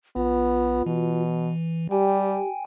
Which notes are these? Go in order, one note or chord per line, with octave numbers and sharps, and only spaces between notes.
A#1 B3 F4
B2 E3
G3 G4 G5 G#5